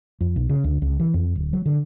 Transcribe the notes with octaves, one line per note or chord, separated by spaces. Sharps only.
F2
B1
C#3
D2
C#2
E3
F2
D1
F#3
D3